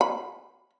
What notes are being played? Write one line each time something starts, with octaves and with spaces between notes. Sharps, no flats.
B5